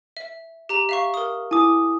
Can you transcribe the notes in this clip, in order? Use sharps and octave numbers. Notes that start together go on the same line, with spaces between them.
E5
G4 A#5 F7
E5 F5 C#6
A#4 D#6
E4 G#5 D6 D#6